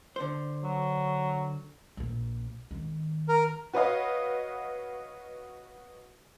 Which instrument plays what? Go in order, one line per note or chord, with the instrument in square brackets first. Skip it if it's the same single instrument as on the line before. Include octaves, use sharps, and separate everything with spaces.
[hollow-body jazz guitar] D3 C5
[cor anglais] F#3
[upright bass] A#1 A#2
G#1 D#3
[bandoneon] A#4
[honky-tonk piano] F#4 B4 C#5 D#5 F5